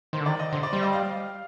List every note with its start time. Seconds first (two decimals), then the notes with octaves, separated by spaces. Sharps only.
0.13 D#3 C5
0.20 D3
0.26 D#3 D5
0.39 D#5
0.53 D3 C5
0.63 D5
0.73 G3 C5
0.83 D#5
0.93 F5